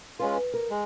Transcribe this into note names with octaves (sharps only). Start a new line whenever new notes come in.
G#3 C#4 F4 B4
A#4
G#3